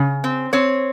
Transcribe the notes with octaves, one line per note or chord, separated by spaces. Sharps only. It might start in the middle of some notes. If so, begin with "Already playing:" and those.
Already playing: C#3
C4
C4 C#5